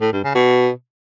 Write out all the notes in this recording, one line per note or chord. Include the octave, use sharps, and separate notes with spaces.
A2
G2
C#3
B2